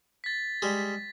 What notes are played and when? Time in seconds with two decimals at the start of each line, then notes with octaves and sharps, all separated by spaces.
0.24 A6 B6
0.62 G3 G#3